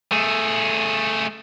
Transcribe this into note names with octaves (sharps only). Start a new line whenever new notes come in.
A3 G#4